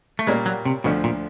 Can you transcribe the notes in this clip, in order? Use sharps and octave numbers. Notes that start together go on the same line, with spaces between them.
A3
A#2 G3 G#3 A#3 C#4
F#3
C3
D2 B2 D3 F3
A#2